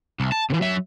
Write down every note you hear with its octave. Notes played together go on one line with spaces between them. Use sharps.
C2
A5
C3 E3
F#3 E5